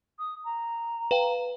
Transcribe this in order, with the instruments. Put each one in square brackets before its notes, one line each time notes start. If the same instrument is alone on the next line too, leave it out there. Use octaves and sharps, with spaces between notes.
[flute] D#6
A#5
[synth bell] B4 F5 G5